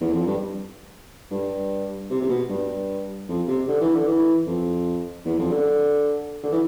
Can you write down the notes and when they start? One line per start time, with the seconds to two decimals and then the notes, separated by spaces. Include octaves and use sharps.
0.01 E2
0.13 F2
0.27 G2
1.31 G2
2.10 C3
2.22 C3
2.29 B2
2.50 G2
3.29 F2
3.48 C3
3.68 D3
3.81 E3
3.95 D3
4.07 E3
4.47 F2
5.25 E2
5.39 F2
5.51 D3
6.43 D3
6.52 E3